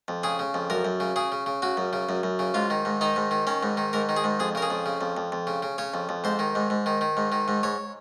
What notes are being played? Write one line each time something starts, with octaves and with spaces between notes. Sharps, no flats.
F2
C#3 G#4
C#3
F2
F#2 A#4
F#2
C#3
C#3 G#4
C#3
C#3
C#3 F#4
F#2
C#3
F#2
F#2
C#3
G#2 F4
D#3
G#2
D#3 D#4
G#2
D#3
D#3 C#4
G#2
D#3
G#2 A#4
D#3
G#4
G#2
F2 G#4
C#3 A#4
G#4
F2
C#3
F2
F2
F2
C#3
C#3
C#3 C#5
F2
F2
G#2 C5
D#3
G#2
G#2
D#3
D#3
G#2
D#3
G#2
G#2 C#5